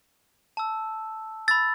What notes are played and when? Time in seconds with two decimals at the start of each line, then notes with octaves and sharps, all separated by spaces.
0.57 A5 E6
1.48 B5 E6 A6